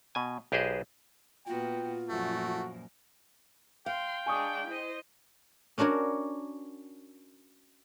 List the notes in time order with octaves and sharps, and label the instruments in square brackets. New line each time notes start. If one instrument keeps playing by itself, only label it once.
[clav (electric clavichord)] B2 G#5
B1 G4 G#4 B4 C5 D#5
[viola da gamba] A#2 B3 F#4 [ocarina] F4 [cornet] G5
[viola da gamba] F#2 A#2 F3 [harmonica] A3 [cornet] F#4
[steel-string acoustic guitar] F5 [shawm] G5 [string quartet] C6
[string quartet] G#3 D4 [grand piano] G#5 C#6 D#6
[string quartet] E4 C5 D#5
[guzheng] C#4 D4 F#4 A#4 C#5